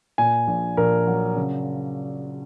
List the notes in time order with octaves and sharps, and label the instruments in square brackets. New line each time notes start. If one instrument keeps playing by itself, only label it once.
[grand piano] A#2 G#5
A#1
A#1 A#4
F#3
C#3